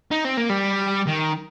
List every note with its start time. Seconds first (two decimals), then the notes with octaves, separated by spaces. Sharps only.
0.11 D#4
0.25 C4
0.37 A#3
0.50 G3
1.07 D#3